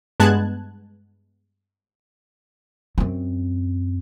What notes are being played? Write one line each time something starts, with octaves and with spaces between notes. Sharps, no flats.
G2 G#3 B3 A5 F#6 G#6
F#2 C4